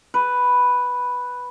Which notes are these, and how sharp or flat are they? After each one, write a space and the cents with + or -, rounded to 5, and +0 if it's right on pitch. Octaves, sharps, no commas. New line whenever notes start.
B4 +0